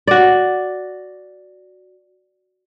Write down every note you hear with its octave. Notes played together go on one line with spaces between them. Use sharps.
F#4 D5